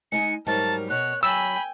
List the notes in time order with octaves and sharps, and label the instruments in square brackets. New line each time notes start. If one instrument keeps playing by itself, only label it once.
[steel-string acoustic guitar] G#3 D#4 G#5 [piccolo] C#7
[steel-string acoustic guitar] G#2 F#3 G3 [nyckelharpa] A#4 [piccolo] A5
[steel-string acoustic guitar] B2 [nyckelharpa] C#5 [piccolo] F#6
[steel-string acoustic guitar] F#3 [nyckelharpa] G5 G#5 [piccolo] B5 [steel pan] E6